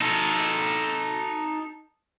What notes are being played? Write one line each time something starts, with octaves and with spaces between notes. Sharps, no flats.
D#4 A4